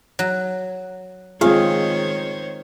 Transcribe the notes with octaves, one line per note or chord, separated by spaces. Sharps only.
F#3
D#3 G#3 C4 F4 G#4 C5 C#5 F5